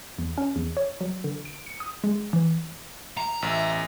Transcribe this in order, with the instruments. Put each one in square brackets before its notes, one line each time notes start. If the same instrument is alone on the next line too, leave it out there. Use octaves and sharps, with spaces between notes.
[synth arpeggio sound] E2
C#4
E2
C#5
F#3
D3
D7
C#7
D#6
G#3
E3
[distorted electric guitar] A#5
[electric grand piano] A1 [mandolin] E4 F#4 E5
[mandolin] B3 F#4